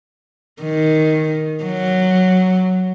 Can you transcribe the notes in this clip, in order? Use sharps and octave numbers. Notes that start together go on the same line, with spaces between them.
D#3
F#3